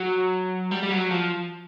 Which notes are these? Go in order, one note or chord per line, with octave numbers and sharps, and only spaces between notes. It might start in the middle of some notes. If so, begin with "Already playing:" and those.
Already playing: F#3
G3
G3
F#3
F3